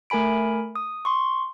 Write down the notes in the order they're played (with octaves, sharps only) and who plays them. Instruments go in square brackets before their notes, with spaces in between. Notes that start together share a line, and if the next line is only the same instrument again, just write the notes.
[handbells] A3 A#4 G#5 B5 D7
D#6
C6 C#6